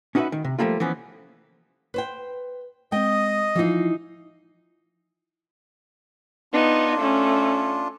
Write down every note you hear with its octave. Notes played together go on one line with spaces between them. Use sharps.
C#4 D#4 F#4 A4 B4 E5
D#3
C3
F3 G3 A3 A#3 F4
E3 F3 B3 C#4
B4 C5 G5
G#3 C4 D#5 G5 D#6
E3 F3 D#4 F4 C7
B3 D4 D#4 F4
A3 C#4